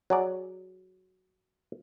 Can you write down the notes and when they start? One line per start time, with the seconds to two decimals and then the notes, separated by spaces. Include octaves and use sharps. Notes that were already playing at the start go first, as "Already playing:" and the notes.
0.10 F#3 G#4 D5